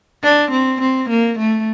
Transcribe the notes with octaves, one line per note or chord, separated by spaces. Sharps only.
D4
C4
C4
A#3
A3